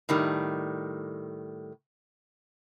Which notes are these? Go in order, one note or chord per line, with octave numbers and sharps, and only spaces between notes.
A2 D#3 G3